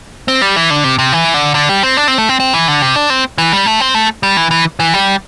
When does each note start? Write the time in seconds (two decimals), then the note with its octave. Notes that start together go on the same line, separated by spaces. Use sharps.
0.28 C4
0.42 G3
0.56 E3
0.70 D3
0.84 C3
0.99 C3
1.13 E3
1.34 D3
1.55 D3
1.69 G3
1.83 C4
1.97 D4
2.08 C4
2.18 A3
2.29 C4
2.40 C4
2.54 E3
2.68 D3
2.82 C3
2.96 D4
3.10 C4
3.38 E3
3.52 G3
3.66 A3
3.80 C4
3.94 A3
4.23 G3
4.37 E3
4.51 E3
4.80 E3
4.94 G3